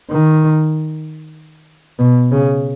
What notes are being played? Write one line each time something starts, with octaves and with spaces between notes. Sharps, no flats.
D#3
B2
C#3